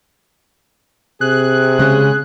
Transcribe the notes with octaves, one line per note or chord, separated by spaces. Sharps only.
C3 G#4 F#6
C#3 G#3